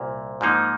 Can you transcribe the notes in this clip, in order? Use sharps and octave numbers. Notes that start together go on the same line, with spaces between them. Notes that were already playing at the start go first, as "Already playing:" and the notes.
Already playing: C2 A#2
G#2 F3 A#3 D#4